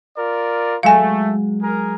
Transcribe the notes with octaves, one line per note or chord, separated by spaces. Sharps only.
F4 A#4 D5
F#3 G#3 A3 F5 G#5
G#4 A#4